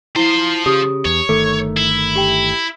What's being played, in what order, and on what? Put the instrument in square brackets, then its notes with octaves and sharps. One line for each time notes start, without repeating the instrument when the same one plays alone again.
[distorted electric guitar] F3 C5 [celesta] E4 G7
[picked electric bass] C#3 [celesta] G4 D#6
[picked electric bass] E2 [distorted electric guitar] C#5
[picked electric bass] G1 D#3 A3 [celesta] A4
[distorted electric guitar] E4
[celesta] G4 G5